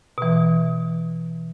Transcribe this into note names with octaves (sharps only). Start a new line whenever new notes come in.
B2 E3